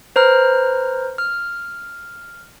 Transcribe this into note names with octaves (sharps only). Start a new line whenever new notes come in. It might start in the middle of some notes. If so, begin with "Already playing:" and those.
B4 C5 A#5 F6
F6